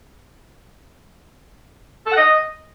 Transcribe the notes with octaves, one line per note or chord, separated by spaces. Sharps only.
A4
F#5
D#5